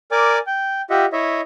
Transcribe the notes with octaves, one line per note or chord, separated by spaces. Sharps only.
A#4 D5 G#5 D6
G5
F4 G4 D#5 E5 F#5
E4 C#5 D#5 E5